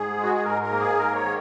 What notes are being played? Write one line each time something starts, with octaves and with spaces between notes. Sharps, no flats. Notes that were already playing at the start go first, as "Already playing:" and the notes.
Already playing: G#2 G#4
G#3
F#4
G#4
G#2 A#4
A#4
A#3
G#4
G#2 A#4
C#5
D#3